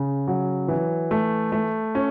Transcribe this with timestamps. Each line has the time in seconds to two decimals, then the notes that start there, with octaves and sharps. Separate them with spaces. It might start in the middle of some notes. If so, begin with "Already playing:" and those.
Already playing: C#3
0.28 F#3
0.68 E3
1.11 A3
1.52 A3
1.95 C#4